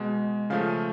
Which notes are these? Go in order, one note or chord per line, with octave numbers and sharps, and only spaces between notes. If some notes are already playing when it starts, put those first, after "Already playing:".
Already playing: B2 G#3
C#3 F3 A3 F5